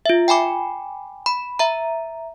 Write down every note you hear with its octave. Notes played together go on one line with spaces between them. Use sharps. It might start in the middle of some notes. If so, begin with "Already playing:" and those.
F4 E5
G5 G#5 B5 D6
B5
E5 A#5